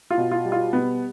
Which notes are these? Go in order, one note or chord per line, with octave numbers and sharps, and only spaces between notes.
F4
B2
F4
G3
F4
B2 B3